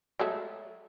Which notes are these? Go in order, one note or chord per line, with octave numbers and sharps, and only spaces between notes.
F#3 G#3 A3